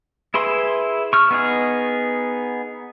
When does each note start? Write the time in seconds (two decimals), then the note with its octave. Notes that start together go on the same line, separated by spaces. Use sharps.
0.34 E4 G#4 B4 C6
1.13 C#6 F6
1.31 B3 D#4 G#4